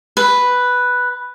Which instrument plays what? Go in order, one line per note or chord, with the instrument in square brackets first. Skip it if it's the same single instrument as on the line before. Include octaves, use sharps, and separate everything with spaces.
[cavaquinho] B4